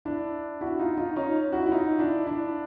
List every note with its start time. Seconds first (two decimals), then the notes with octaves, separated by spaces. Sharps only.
0.05 D4 E4
0.61 E4 F#4
0.79 D#4 F4
0.97 D#4 F4
1.16 C#4 D#4
1.52 E4 F#4
1.66 E4
1.72 D#4 F4
1.99 D4 E4
2.26 D4 E4